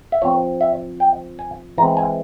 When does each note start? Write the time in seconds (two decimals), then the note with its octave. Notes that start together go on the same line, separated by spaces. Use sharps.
0.12 E5
0.22 F3 C4 C#5
0.61 E5
1.00 G5
1.39 G#5
1.78 E3 G#3 C4 A#5
1.97 G#5